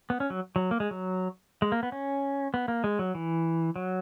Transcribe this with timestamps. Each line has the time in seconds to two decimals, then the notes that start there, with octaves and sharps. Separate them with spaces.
0.10 B3
0.20 C#4
0.30 F#3
0.56 F#3
0.71 A#3
0.80 G#3
0.91 F#3
1.62 G#3
1.72 A#3
1.83 B3
1.92 C#4
2.54 B3
2.68 A#3
2.84 G#3
2.99 F#3
3.15 E3
3.76 F#3